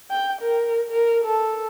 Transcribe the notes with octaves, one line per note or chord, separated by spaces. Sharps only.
G5
A#4
A#4
A4